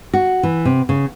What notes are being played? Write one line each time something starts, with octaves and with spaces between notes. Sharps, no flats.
F#4
E3
C3
C#3